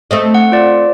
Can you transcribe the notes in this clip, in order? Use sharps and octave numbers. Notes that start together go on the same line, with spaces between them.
A3 C4 D#5
F#5
F4 D5